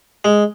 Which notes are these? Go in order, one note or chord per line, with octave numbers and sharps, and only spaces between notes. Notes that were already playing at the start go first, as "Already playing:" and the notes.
G#3